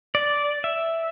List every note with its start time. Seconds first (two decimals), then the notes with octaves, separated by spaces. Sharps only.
0.15 D5
0.64 E5